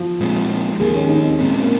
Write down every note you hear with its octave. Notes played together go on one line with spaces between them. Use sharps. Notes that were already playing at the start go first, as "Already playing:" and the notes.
Already playing: F3
A#2 G#3 C4
D#2 D#3 G#3 A#3
C#4
D#4
C4
A#2 G#3 C4 C#4
A#3